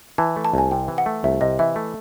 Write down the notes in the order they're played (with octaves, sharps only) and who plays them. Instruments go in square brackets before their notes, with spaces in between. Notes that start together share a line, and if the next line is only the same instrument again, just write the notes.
[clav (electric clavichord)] E3 [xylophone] A5
[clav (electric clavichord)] A3
[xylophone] A5
[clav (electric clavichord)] C2 [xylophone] G#5
[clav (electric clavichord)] C3 [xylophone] G5
[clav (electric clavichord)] E3
[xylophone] F#5
[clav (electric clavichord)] A3
[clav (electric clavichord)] C2 [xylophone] E5
[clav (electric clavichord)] C3 [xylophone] D#5
[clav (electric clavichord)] E3 [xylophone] E5
[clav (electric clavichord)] A3